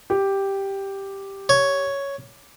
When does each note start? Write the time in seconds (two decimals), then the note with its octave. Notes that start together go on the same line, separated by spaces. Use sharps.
0.10 G4
1.49 C#5